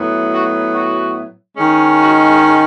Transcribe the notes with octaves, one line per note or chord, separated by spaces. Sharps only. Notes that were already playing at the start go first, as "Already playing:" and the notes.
Already playing: A2 F#3 B3 E4
F#4
F#4
D#3 G#3 C#4
F#4